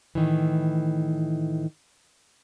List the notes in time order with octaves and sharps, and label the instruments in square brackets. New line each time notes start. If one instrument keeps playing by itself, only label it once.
[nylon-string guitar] A2 D#3 E3